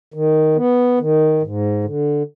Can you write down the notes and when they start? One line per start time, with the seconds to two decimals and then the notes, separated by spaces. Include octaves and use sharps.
0.14 D#3
0.56 B3
1.00 D#3
1.43 G#2
1.84 D3